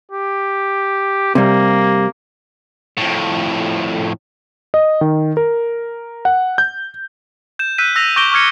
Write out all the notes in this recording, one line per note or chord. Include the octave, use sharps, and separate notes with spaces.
G4
C3 G3 A#3
F2 A2
D#5
D#3
A#4
F#5
G6
G6 E7
E6 F#6 G6 B6 D#7
E6 A#6 F7
C#6 D6 G6 A#6 D7 G7
C#6 D6 F6 G#6 C#7